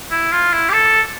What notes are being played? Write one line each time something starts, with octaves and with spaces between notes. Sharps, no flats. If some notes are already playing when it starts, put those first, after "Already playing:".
E4
F4
E4
G4
A4